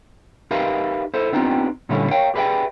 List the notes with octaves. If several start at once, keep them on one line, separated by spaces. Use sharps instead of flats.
D#4 G4 A#4 B4 E5 F5
E4 A4 C5
B3 C4 D4 D#4 F4 G4
A#2 D3 G3 A3 C#4 E4
A#4 C#5 F5 G5
G4 G#4 B4 D5 E5 G5